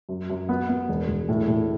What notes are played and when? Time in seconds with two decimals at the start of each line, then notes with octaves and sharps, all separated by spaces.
0.09 F#2
0.30 F#2
0.49 B3
0.69 B3
0.89 E1
1.08 E1
1.29 A2
1.47 A2